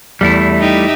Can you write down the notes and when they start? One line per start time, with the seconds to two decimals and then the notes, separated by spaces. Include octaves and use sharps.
0.21 E2 G3 A3 E4
0.60 D#4 G4 E5